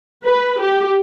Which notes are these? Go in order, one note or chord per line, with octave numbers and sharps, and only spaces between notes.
B4
G4